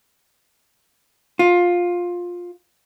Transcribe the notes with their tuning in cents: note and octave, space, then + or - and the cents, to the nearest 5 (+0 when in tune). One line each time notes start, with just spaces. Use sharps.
F4 +15